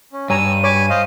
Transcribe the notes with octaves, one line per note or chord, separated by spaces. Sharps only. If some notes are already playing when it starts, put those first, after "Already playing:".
C#4
G2 C#5 G#5 A#5 E6 D#7
C#5 G#5 B5 C#6 D6
C5 D#5 F5